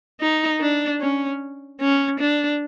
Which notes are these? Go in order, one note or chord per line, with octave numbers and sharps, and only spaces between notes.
D#4
D4
C#4
C#4
D4